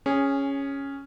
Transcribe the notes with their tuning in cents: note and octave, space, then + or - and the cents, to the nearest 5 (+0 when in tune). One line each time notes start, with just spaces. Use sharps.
C#4 +0 G#4 -15